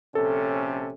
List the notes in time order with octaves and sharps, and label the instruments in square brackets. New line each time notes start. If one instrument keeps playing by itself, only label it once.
[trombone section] A#1 C3 C#4 [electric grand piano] A4